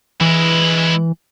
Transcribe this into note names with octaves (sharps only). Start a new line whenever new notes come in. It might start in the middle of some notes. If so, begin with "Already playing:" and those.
E3 G#3 E4